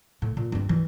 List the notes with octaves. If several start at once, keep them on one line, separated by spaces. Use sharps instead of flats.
A2
A#2
G2 C4
E3